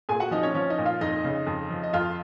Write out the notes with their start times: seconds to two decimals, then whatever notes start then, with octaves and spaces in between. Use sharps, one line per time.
0.09 A#2 G#4 G#5
0.20 F#4 F#5
0.31 F3 D#4 D#5
0.43 C#4 C#5
0.54 F3 C#4 C#5
0.70 D#4 D#5
0.78 A#2
0.86 F4 F5
1.01 F2 D#4 D#5
1.24 C#3
1.47 F2
1.70 F3
1.83 D#5
1.93 F2 F4 F5